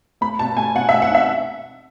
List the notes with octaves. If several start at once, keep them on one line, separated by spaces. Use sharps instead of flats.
A3 B5
B2 A5
A3 G#5
B2 F#5
E5
A3
F#5
D#4 E5